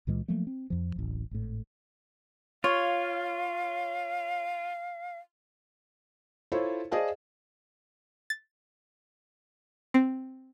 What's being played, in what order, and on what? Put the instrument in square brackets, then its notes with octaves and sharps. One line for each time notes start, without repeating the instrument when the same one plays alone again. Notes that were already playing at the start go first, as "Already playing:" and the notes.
[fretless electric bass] C#2 A#2 E3 G#3
F3 F#3 A3 A#3
C4
F2 F3
D1 A1
G#1 A2
[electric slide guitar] F4 [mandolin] C#5 [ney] F5
[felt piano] E4 F4 A4 C5 C#5
G#4 C5 D5 D#5 F5 A5
[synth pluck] A6
C4